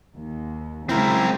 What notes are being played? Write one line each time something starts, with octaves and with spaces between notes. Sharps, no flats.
D#2
C#3 F#3 G#3 C4 E4 A#4